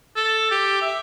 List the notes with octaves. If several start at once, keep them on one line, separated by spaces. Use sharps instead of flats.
A4
G4
E5